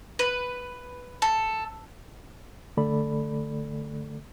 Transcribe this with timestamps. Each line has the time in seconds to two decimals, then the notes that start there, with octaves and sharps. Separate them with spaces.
0.19 B4
1.22 A4
2.77 D3 A3 A4 D5 B5